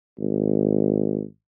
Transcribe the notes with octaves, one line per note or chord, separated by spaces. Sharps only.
G#1